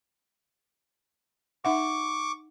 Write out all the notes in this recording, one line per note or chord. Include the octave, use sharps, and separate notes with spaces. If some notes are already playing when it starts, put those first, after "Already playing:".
D#4 E5 F#5 C#6 D6